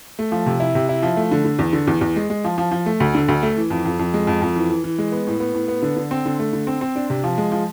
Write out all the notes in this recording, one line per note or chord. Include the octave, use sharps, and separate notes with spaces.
A3
F3
C3
E4
C3
E4
F3
A3
D3
D3
E2
D3
E2
E2
G#3
G#3
F3
F3
F3
A3
D2
D3
D2
A3
E3
F2
F2
F2
G#3
F2
F2
E3
E3
E3
G#3
B3
A2
B3
A2
B3
D3
D3
C4
D3
A3
D3
C4
C4
D4
C3
F3
G#3
F3